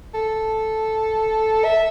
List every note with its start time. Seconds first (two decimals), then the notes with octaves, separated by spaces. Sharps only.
0.14 A4
1.65 E5